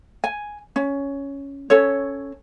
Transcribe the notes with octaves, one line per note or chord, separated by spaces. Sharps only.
G#5
C#4
C#4 A4 C#5